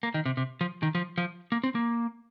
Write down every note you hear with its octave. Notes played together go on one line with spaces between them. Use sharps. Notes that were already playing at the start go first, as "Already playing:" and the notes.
A#3
D#3
C3
C3
F3
D#3
F3
F3
A#3
C4
A#3